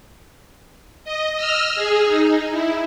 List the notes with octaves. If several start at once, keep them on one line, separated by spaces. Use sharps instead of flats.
D#5
D#5 E6 F6
G#4
D#4
E4